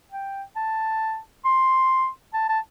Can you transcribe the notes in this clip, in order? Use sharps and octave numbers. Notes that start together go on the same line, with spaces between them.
G5
A5
C6
A5
A5